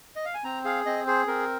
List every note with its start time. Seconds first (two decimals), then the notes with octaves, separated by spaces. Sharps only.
0.16 D#5
0.25 F5
0.34 G#5
0.44 C4 A#5
0.65 G#4 F5
0.86 C4 D#5
1.07 G#4 C5
1.27 C4 A#4